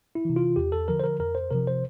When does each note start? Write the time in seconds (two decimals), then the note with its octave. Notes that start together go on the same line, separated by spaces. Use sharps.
0.15 E4
0.25 C3 E3
0.36 F4
0.56 E2 G4
0.72 A4
0.88 D3 F3 A#4
1.00 C5
1.04 A#4
1.20 F2 A#4
1.35 C5
1.51 C3 F3 A#4
1.67 C5